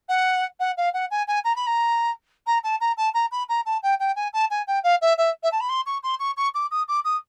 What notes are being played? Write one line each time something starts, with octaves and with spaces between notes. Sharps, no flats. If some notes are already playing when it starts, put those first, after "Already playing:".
F#5
F#5
F5
F#5
G#5
G#5
A#5
B5
A#5
A#5
A5
A#5
A5
A#5
B5
A#5
A5
G5
G5
G#5
A5
G#5
G5
F5
E5
E5
E5
A5
B5
C6
C#6
C6
C#6
C#6
D6
D#6
D6
D#6